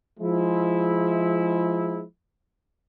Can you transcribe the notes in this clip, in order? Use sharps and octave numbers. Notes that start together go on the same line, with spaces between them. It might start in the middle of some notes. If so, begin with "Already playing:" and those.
F3 G#3 E4